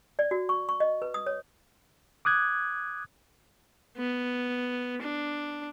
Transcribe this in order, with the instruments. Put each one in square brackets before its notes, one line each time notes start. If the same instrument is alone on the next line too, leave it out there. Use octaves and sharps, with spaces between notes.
[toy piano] D5
F#4
C#6
C#6
D#5
B4
D#6
C#5
[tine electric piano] D6 D#6 F#6 G#6
[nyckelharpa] B3
D4